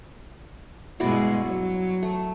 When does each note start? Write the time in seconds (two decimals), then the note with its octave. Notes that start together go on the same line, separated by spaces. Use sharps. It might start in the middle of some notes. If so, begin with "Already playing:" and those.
1.00 G2 B2 G#3 E4 F#4 D5
1.44 F#3
2.03 A3